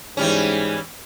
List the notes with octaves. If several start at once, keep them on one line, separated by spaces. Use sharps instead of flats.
G#2 E3 G3 C#4